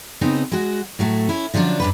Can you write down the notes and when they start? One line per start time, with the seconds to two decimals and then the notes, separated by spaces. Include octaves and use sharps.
0.21 C#3 B3 C4 D#4
0.52 G#3 F#4
0.99 A2 F#3 A3
1.29 C#4 E4
1.54 D3 F3 F#3 C#4 D4
1.80 F#2 D4 B4